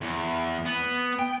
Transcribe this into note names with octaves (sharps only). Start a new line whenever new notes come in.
E2
B3
G5